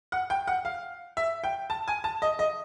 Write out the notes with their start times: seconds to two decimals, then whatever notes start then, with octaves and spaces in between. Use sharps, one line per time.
0.12 F#5
0.30 G5
0.47 F#5
0.65 F5
1.17 E5
1.44 G5
1.70 A5
1.88 G#5
2.04 A5
2.22 D#5
2.39 D#5